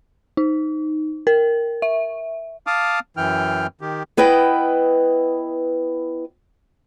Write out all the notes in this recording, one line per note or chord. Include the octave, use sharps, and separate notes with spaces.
D#4
A#4
E5
F5 A5 D6 D#6 F6
F#2 E3 G5 F6
D#3 G4
B3 E4 B4 D#5 G5